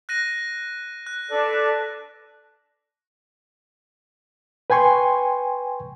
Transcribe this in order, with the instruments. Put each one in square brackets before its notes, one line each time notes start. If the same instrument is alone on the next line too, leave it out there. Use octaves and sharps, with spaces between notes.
[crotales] F#6 A#6 D#7
F#6
[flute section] D4 B4 A5 [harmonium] A4 D5
[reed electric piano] B4 G5 G#5 C6 C#6